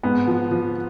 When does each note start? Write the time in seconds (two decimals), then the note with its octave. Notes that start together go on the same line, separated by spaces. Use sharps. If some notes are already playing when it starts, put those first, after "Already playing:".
0.03 G#2 B3
0.28 F3
0.51 F3